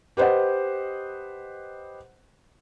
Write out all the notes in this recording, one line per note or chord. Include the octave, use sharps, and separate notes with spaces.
G4 B4 C5 D#5 F#5